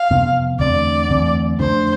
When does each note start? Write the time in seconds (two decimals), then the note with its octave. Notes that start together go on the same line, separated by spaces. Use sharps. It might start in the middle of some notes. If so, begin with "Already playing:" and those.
Already playing: F5
0.10 F2 C3 F3 B3
0.59 E2 D3 A3 C4 D5
1.09 E2 D3 A3 C4
1.59 F2 D3 A3 D4 C5